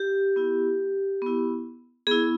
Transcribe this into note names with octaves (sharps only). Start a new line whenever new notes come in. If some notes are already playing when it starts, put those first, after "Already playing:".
Already playing: G4
B3 E4
B3 E4
B3 E4 G#4